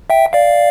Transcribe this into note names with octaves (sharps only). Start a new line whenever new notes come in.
E5 G5
D5 F5